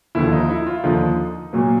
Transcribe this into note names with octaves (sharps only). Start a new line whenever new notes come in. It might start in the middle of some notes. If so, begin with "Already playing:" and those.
D#2 D3 F3 E4
D#4
E4
F4
D#2 D3 F3 D#4
A#2 F#3 A#3